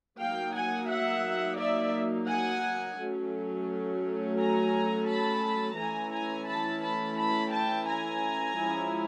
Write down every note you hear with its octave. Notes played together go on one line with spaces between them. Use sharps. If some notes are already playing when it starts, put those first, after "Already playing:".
F#3 A#3 D#4 F5 G5
F#5 G#5
E5 F#5
D5 E5
F#5 G#5
F#3 A3 C#4
G#5 A#5
A5 B5
E3 A3 C#4 E4 G#5 A#5
G#5 A#5
A5 B5
A5 B5
A5 B5
G5 A5
G#5 A#5
F3 G#3 C#4 E4